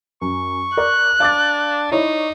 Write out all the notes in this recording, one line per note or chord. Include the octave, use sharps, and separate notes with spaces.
F#2 C#6
A#4 D5 F#6
D4 F5 D6 A6
D#4 E4 C#5 D5